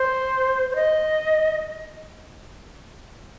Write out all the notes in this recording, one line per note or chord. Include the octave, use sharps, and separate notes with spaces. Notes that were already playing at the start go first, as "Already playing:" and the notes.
Already playing: C5
C5
D#5